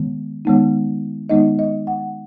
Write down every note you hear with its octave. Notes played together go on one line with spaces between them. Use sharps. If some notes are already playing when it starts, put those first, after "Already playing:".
Already playing: D#3 G#3 B3
D#3 G#3 B3 D#4
D#3 G#3 B3 D#4 D#5
D#5
F#5